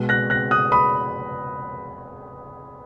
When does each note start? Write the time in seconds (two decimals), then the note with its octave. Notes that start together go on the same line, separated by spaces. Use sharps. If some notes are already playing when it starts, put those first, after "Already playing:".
Already playing: B2 G#3
0.09 F#6 A#6
0.30 F#6 A#6
0.51 D#6 F#6
0.72 B5 D#6